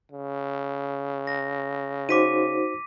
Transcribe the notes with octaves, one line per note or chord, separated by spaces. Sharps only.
C#3
A#6
D#4 F#4 C5 D6 B6 D#7